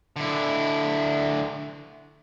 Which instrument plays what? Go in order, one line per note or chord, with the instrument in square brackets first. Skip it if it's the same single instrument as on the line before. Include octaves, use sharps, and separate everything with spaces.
[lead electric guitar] D3 E4